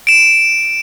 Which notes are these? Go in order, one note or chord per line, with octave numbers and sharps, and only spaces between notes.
D7 E7